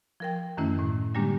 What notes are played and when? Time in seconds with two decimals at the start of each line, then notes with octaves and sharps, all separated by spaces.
0.20 F3 A#4 G5
0.57 F#2 D#3 E3 A3 C#4 E4
0.79 A2 D#3
1.14 D3 G3 G#3 A#3 D4 G4